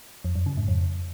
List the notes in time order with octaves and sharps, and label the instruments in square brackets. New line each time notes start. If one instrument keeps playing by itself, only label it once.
[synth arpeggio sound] F2
F#2
C#3
G#2
F2